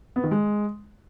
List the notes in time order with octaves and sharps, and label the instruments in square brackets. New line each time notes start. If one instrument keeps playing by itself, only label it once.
[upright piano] B3
D#3
G#3